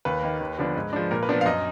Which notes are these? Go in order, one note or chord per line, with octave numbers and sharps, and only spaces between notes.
D#2 B4
D#3 A#3
D#2
D3 F3 B3 D4
G#2
F3 G#3 D4
A#2 A#4
B4
F3 B3 D4
F5
F#2 D#5